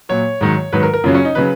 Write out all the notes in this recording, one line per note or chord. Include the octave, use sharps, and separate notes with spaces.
A#2 F#3 C#5
G#2 D#3 F#3
G#2 D#3 F#3 B4
A#4
A#4
F#2 C#3 F#3 F4
C#4
D#4
C#3 F#3 B4